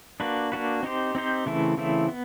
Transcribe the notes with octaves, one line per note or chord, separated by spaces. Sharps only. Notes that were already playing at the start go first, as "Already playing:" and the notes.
A#3 D4 F#4 B4
A#3 D4 F#4 B4
C4 D#4 G4 C5
C4 D#4 G4 C5
C#3 E3 A3 C4 E4
C#3 E3 A3 C4 E4
B3